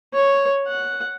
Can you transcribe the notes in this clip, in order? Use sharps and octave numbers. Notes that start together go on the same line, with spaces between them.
C#5
F#5